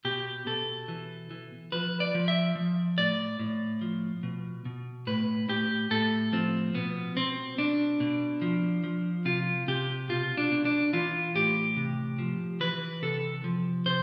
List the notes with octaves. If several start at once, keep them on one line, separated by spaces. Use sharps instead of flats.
B2 G4
B2 A4
E3
E3
F3 B4
D5
F3
E5
F3
A2 D5
A2
F3
B2
B2
A2 B4
A2 G4
A2 A4
F3 C4
B2 B3
B2 C4
B2 D4
B2
F3
F3
C3 F4
C3 G4
B2 F4
D4
B2
D4
E3 F4
A2 G4
C3
F3
E3 B4
C3 A4
F3
C3 C5